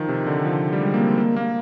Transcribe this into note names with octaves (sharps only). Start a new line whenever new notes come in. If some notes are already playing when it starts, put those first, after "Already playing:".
Already playing: D#3 F3
C3
D3
F3
G3
G#3
A#3
C4
A#3
A#3